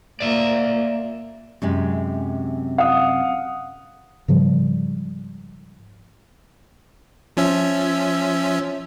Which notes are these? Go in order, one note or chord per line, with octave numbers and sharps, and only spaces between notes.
A#2 A#3 D5 E5
F#2 C3 G#3
F5 F#5 D#6
G#2 C#3 F3 G3
F3 C#4 E5